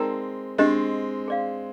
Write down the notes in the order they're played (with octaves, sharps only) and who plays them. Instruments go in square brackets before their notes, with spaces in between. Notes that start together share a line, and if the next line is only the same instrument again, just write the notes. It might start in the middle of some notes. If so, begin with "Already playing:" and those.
Already playing: [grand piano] G#3 C4 [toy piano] D#4 A#4 D5 G5 A#5
[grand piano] G#3 C4 [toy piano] D4 G4 C5 D#5
[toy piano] G#4 D5 F5